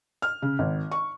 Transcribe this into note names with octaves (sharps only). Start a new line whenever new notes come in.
F6
C#3
G#1
C#6